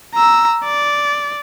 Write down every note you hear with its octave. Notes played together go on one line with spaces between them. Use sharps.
A#5 E6
D5